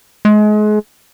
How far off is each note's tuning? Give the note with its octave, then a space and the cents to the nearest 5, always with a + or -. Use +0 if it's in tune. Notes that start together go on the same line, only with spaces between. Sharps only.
G#3 +30